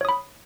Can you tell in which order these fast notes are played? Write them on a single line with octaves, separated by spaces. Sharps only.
C#5 D#6 B5